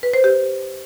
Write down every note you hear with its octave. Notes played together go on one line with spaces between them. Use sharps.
B4
C5
G4